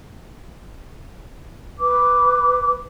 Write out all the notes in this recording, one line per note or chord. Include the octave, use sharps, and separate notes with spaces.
B4 D6